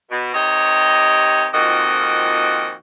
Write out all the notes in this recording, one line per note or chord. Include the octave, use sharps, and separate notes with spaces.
B2
C3 D#3 G4 C#5 D#5
F2 A#2 D#3 C4 F#4 D#5